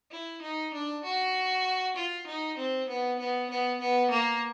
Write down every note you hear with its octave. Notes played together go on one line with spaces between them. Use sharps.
E4
D#4
D4
F#4
F4
D#4
C4
B3
B3
B3
B3
A#3